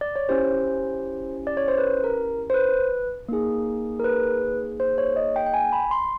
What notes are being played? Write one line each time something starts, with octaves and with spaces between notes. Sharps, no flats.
D5
C#5
C#4 E4 G4 C5
D5
C#5
C5
B4
A#4
C5
B4
A#3 D#4 G#4
A#4
B4
C5
C#5
D#5
G5
G5
G#5
B5
C6